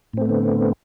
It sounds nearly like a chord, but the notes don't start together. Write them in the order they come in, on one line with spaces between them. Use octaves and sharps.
A2 C4 A3 B3 D3